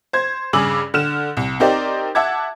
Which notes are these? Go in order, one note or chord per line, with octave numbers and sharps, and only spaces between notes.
C5 G#6
G2 C#3 G#4 D6 E6 F#7
D3 F6 E7
C2
C4 D#4 G4 A#4 C5 D5
E5 F#5 A5 D6 G#6